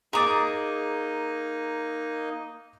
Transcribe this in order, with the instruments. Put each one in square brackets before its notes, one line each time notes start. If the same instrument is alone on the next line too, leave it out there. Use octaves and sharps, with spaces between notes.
[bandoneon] A#3 D#4 D#5 [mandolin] G#4 D6 [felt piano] A#5 D#6 A6